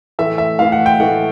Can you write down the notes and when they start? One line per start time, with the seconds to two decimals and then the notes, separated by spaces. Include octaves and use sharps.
0.19 A2 E3 A3 E5
0.38 E5
0.59 A2 E3 A3 F5
0.72 F#5
0.86 G5
1.00 A2 E3 A3 F#5